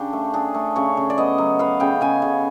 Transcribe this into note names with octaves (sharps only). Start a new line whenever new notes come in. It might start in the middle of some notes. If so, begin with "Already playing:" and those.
Already playing: C#3 D4 G4
A3
D4 G#4
A3
C#3 C#5
C#3
D5
B3 D#5
F#3
B3 F5
C#3 G5
C#3 G#5
C#3